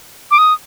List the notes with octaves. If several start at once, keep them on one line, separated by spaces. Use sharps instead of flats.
D6
D#6